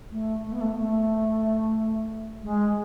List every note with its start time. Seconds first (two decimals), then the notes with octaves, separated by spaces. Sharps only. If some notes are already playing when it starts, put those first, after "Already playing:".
0.11 A3
0.44 A3
0.52 B3
0.60 A3
0.77 A3
2.43 G#3